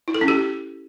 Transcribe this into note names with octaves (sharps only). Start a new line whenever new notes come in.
E4
A4
C#4
G4